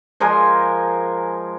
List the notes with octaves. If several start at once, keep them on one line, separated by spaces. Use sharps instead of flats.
F3 G#3 A#4 G#5